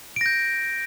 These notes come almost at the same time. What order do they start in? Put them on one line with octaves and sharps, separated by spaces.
D7 A#6 G6